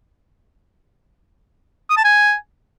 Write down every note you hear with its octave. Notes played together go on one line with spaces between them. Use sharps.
D#6
A5
G#5